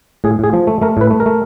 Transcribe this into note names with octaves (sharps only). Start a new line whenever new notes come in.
A2 G#4
A2 G#4
F3
A3
A3 A#4
A2 B4
A3
A#4
A3